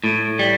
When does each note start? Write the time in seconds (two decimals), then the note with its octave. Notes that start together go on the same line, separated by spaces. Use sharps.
0.04 A2
0.39 G3